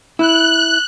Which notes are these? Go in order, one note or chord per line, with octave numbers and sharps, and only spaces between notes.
E4 F#6